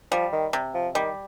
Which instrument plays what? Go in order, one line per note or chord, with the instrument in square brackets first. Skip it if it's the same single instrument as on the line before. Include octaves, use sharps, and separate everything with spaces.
[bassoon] F3 [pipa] G3
[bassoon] D#3
[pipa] C3
[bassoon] F3
[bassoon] D#3 [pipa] G3